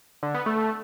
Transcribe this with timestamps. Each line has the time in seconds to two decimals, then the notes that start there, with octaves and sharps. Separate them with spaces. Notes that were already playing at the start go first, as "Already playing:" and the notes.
0.23 D3
0.34 B3
0.46 A3